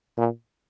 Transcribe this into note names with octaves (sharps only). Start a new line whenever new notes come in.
A#2